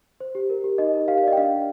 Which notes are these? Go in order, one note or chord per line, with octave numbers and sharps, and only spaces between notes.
C5
G4
A#4
G4
D#4 D#5
A#4
G4 F5
F5
D5 D#5
G5
D4 F5
D4